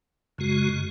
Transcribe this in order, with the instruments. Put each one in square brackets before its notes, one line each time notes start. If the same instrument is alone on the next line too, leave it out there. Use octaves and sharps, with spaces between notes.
[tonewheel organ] F#2 C#3 G#3 F#4